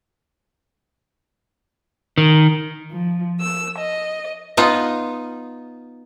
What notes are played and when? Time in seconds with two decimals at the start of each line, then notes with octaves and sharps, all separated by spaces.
2.18 D#3
2.90 F3
3.39 E6
3.76 D#5
4.57 B3 D#4 F4